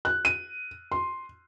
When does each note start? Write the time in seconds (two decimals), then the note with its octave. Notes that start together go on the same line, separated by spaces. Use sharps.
0.05 F#6
0.25 D#7
0.92 C6